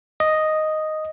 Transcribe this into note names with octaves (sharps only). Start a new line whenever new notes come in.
D#5